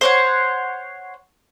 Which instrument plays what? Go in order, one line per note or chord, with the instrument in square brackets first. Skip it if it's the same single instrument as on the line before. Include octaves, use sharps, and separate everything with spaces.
[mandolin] C5 C#5 F#5